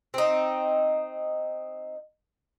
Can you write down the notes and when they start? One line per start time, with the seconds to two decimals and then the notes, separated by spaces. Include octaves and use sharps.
0.14 C4 D#4